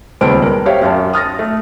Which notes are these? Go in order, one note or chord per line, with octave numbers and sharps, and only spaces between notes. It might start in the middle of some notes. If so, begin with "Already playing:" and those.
D#1 C#2 B3 C4 A5 D7
A#4
G4 C5 C#5 E5 F5 G5
F#2 F5 G5 A5
D#6 F6 A6 A#6
A3